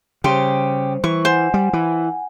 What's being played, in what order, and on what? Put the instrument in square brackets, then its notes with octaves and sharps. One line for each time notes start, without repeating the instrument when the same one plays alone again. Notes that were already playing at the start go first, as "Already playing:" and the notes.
[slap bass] C#3 [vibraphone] G3 C5 [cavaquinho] G4 C6
[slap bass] E3 [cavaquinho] C#6
[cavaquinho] C5 [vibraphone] F#5 G#5
[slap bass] G3
E3